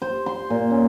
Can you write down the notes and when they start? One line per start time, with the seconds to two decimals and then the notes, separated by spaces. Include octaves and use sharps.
0.02 C5
0.26 C6
0.50 A#2
0.71 C#4